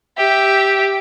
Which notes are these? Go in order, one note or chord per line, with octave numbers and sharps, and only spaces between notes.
G4 E5